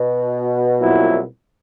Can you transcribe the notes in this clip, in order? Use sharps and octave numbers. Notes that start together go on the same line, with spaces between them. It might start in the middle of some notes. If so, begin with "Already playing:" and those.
Already playing: B2
C2 A#2 F#3 B3 E4